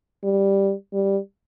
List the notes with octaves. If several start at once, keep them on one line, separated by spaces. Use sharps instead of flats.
G3
G3